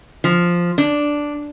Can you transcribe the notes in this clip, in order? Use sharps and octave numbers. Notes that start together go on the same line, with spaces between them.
F3
D4